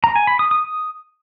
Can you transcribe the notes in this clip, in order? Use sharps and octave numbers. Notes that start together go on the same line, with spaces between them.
A#5
G#5
B5
D#6
D#6